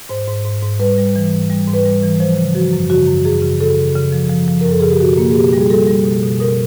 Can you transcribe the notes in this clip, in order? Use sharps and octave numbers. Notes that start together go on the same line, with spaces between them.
G#2 C5
G#2
G#2
G#2
G3 B4
G3
E3
G#2
G3
G#2
B4
G3
E3
F3 C5
C#3
F3 F#4
F#2
C#3 F#4
F#2
F#2 G#4
C#3
C#3 A4
C#3
C#3
F3
F3
F3
F#2 A#4
A4
C#3 G#4
G4
B2 F#4
A#3
G#4
B2 G4
G3
G#4
G3 A4
G3
B2
B2
B2 A#4